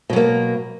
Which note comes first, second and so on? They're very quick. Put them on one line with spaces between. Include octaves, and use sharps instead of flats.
B2 F#3 A#3